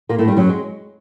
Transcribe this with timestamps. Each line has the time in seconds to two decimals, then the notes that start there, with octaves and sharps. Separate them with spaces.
0.09 A#2 A#3
0.19 A2 A3
0.28 G2 G3
0.37 F#2 F#3
0.49 G#3